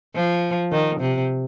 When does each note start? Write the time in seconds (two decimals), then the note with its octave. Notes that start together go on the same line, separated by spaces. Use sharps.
0.15 F3
0.72 D#3
1.00 C3